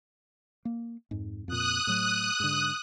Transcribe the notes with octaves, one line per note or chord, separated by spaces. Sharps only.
A#3
F2 G#2
F2 A#2 D#6 F#6
A2 F#3
G#2 D3